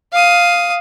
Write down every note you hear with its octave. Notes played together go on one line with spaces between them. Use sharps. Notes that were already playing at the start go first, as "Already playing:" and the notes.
F5 D#6